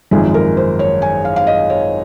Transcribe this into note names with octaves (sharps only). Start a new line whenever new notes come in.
G#1 F#2 F3 G#3 G#4
A#4
C5
C#5
G#5
F5
F5
D#5
C#5